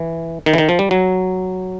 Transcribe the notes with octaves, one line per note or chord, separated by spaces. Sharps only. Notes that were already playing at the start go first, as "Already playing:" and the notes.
Already playing: E3
D#3
E3
D#3
F3
G3
F#3